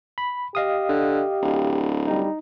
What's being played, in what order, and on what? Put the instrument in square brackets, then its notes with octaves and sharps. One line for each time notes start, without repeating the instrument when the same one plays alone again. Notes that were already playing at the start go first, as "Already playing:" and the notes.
[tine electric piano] B5
[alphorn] G4 [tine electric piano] D#5 F5 D#6
[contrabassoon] D3
D1
[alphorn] G3 [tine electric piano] D#4